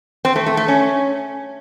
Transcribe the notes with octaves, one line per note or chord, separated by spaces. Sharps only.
C4
A3
A3
A3
C#4